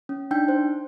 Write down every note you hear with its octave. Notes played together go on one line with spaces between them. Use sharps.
C#4
D4 D#4 G5 G6
C5